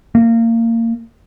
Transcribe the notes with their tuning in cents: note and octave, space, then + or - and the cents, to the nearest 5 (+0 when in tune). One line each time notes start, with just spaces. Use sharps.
A#3 -25